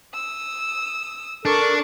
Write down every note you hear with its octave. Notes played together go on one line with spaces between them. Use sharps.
D#6 E6
D4 A4 A#4 C#6 D6